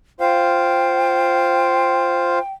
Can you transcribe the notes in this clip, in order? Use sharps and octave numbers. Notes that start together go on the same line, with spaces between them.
F4 C5 F5 G5